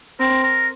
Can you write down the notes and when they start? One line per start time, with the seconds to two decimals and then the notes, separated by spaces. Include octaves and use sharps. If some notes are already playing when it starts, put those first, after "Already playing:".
0.20 C4 A#4
0.43 A#4